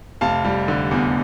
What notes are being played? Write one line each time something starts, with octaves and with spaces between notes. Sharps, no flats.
F1 F5 A5
G3
D3
E2